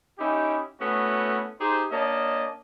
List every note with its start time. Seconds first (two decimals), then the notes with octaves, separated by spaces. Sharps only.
0.18 C#4 D#4 E4 G4
0.80 A3 B3 C#4 E4 F#4
1.60 D#4 G4 G#4 C5
1.91 A#3 C#4 D4 D#5 A5